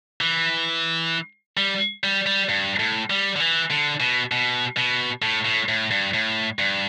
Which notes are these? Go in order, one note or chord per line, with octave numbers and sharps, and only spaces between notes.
E3
G3
G3
G3
G2
A2
G3
D3
E3
D3
B2
B2
B2
A2
A2
A2
G2
A2
G2